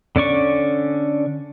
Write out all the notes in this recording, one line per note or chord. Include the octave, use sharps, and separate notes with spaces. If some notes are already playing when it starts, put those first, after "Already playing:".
D3 C#4 D5 C#6